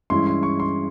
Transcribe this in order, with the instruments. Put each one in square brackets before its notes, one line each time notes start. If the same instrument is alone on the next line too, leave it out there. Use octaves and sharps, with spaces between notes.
[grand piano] G2 E3 G#3 C#4 E4 C6
C6
C#6
C6